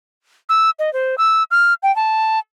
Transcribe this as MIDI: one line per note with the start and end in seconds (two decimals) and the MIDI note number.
0.49 0.70 88
0.79 0.92 75
0.93 1.15 72
1.18 1.43 88
1.51 1.74 89
1.83 1.94 79
1.96 2.39 81